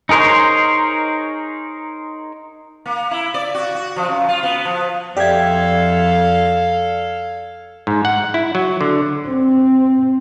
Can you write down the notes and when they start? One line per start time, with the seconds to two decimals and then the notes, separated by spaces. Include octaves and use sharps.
0.09 D#4 G#4 A#4 C5 C#5
2.86 A#3
3.11 E4
3.34 D5
3.55 F#4
3.75 F#4
3.96 F3
4.09 F#2
4.29 F4
4.43 B3
4.65 F3
5.17 F2 G4 A4 D5 E5 F5 G#6
7.87 G#2
8.05 F#5
8.34 E4
8.55 F#3
8.81 D3
9.26 C4